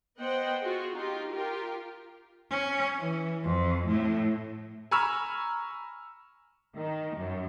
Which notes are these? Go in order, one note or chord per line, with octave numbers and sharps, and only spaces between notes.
B3 C5 D#5 F#5 G5
F4 F#4 G#4
D#4 F4 G4
F4 G4 A#4
C#4
E3
F2
A2
G#5 A#5 B5 C#6 E6 F6
D#3
F#2